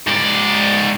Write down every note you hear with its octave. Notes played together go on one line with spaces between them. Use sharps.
G#2 D5